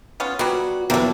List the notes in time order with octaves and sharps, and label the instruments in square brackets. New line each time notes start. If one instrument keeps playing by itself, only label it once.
[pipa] B3 C#4 F4
[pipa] F#3 G3 B3 [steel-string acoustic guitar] F#4
[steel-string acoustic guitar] E2 F#3 [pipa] C3 A#3 A4